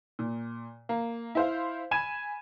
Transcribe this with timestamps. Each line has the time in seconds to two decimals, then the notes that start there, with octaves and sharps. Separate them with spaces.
0.19 A#2
0.89 A#3
1.35 E4 C5 F5
1.91 G#5 B5 G#6 D#7 E7